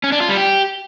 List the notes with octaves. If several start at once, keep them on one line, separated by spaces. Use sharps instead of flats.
C#4
D4
F4
G3
G4